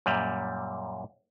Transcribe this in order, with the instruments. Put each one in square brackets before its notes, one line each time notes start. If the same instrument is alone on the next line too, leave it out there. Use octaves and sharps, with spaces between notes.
[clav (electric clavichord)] F#2 A#2 G3